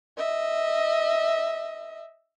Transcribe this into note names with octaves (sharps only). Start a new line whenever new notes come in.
D#5 E5